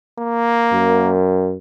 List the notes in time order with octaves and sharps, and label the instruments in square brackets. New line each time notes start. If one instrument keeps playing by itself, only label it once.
[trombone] A#3
[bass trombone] F#2